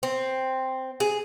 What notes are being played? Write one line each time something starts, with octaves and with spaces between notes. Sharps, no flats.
C4
G#4